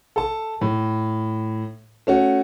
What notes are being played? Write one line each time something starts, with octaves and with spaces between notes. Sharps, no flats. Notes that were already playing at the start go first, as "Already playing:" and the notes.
A4 A5
A2
A3 C#4 F#4